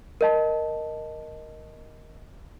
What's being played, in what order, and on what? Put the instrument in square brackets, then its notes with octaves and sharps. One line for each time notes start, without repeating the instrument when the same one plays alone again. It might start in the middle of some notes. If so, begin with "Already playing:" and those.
[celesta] A#4 D#5 A5